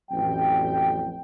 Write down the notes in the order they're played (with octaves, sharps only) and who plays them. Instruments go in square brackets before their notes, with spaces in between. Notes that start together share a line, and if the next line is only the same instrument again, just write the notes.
[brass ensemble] A1 F2 F#3 G5